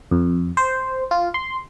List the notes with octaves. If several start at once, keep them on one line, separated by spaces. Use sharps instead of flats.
F2
C5
F4
C6